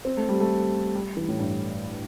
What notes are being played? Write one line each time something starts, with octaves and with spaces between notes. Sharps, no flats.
C4
A3
G3
A3
G3
E3
A2
G2